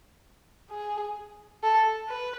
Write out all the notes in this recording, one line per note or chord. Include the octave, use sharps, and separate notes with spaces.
G#4
A4
B4